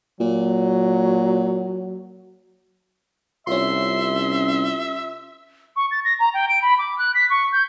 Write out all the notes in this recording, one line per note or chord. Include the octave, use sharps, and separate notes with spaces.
A#2 F#3
C2 C#4 F4 E5 C6
C#6
A6
A#6
A#5
G5
D7
B5
D6
F#6
B6
C#6
G6